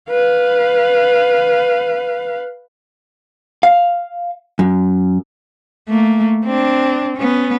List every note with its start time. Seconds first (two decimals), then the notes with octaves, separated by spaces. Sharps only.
0.10 B4 F5
3.63 F5
4.59 F#2
5.88 A3 A#3
6.45 C4 D4
7.17 B3 C#4